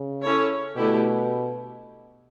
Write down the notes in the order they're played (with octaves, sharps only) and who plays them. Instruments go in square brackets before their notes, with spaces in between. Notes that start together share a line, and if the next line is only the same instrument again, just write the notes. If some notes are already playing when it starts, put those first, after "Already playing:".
Already playing: [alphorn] C#3
[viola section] C#4 E4 A4 C#5
[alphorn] B2 [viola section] D3 A3 E4 G4